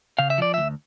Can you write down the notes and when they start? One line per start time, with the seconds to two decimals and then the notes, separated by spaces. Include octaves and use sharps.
0.19 C#3 F5
0.30 E5
0.38 F3 D5
0.54 D2 E5